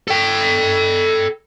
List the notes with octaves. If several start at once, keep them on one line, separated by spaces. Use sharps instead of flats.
A4 G5